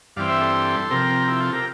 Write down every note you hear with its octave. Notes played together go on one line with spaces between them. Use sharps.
G2 E3 G3 C4 D5 F5
C5 E5
A4 C5
C3 F3 C4 G4 A#4
E4 G4
F4 A4
G4 A#4